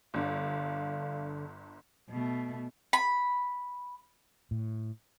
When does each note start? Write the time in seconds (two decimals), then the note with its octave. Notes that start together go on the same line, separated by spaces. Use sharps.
0.14 G1 G2 D3 F5
2.10 B2 A3
2.93 B5
4.51 A2